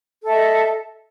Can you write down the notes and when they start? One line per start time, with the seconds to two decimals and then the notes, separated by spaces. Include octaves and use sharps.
0.23 A4
0.26 E5
0.29 D#5